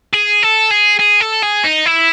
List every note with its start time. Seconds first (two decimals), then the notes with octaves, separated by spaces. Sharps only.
0.13 G#4
0.43 A4
0.71 G#4
1.00 G#4
1.21 A4
1.43 G#4
1.64 D#4
1.86 E4